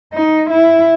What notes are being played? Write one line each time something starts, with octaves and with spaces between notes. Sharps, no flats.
D#4
E4